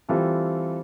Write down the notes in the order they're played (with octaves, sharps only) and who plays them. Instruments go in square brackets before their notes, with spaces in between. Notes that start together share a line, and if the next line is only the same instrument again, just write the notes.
[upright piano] E3 G3 C4 F4 A4